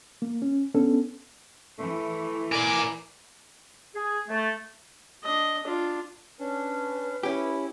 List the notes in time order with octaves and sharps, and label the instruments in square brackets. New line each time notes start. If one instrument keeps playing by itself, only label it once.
[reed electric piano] A#3
C#4
B3 C#4 D4 A4
[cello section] E3 [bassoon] A3
[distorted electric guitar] A#4 D5 [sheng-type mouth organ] G#5 D6
[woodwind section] G#4
A3
[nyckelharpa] D4 D#5
D4 F4
[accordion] C#4 D4 [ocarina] B4
[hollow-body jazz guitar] C#4 G4 [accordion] E4